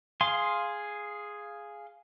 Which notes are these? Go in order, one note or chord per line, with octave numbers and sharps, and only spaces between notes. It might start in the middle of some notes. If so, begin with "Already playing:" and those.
G#4 F5 C6